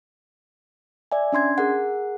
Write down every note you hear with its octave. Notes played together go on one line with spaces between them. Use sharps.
D5 E5 G#5
C#4 D4 C6 G#6
G#4 A#4 F#5